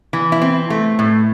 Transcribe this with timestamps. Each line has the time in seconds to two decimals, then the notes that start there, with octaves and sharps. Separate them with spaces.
0.13 E3
0.32 E4
0.42 C4
0.70 A3
0.99 A2